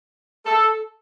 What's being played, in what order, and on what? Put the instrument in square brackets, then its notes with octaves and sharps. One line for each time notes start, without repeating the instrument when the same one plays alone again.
[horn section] A4